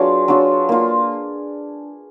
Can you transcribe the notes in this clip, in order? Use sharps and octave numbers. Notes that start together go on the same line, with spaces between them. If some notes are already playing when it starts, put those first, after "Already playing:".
Already playing: F#3 D4 F4 G#4 B4 D5
F#3 D4 F4
A#3 F4